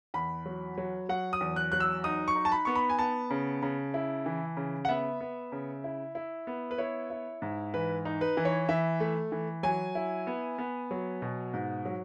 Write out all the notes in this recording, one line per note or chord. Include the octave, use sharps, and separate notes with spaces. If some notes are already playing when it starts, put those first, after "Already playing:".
E2 B5
F#3
F#3
F#3 F#5
D#6
E2
F#6
F#3 F#6
E6
D#4 D#6
C#6
D#4
A5
B5
B3 C#6
B5
G#5
B3 A5
C#3
C#3
E4
E3
C#3
F#5
B3 E5
B3
C#3
E4
E4
B3
B4
E4 C#5
E4
G#2
E3 B4
D#4
B4
E3
C#5
E3 E5
A3
E3
F#3 G#5
E4
B3
B3
F#3
B2
G#2
F#3